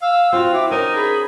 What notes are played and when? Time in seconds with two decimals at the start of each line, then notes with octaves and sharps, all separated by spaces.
0.02 F5 E6
0.33 C4 F4 F#4
0.54 E4 D6
0.71 C#4 D#4 A#4 D#7
0.96 G#4 B5